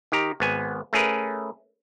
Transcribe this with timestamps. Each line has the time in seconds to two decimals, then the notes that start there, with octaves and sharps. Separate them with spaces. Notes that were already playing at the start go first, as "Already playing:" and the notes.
0.12 D#3 G4 A#5
0.40 G#1 B3 G#5
0.93 A3 C#4 G#4 A#4 B4